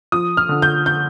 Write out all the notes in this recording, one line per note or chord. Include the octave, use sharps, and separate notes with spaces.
F3 D#6
F6
D3
G6
G6